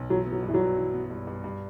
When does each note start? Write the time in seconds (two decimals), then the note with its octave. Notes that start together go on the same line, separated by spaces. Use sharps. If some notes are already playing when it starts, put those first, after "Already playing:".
Already playing: B1
0.10 E3 F#3
0.26 B3
0.32 F#3
0.43 G2
0.48 E3
0.54 F#3
0.60 G2
0.77 E3
0.94 B3
1.10 G2
1.27 G2
1.44 G2